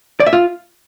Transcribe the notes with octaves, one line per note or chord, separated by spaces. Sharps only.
D5
E5
F4